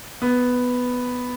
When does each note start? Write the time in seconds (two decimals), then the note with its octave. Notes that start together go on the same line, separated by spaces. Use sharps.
0.22 B3